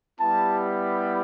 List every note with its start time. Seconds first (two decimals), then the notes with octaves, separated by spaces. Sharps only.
0.20 G3 B3 E4 G4 A5